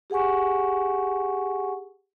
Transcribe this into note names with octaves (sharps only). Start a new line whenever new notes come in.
G4 G#4 F#5 G#5 C#6